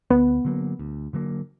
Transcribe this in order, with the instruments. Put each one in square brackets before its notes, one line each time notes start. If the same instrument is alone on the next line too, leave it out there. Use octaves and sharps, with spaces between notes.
[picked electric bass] D2 [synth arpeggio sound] B3
[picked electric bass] D3 F#3 A#3
D2
D3 F#3 A#3